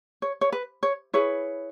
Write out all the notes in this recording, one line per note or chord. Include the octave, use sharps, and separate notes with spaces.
C#5
C#5
B4
C#5
E4 G#4 B4 C#5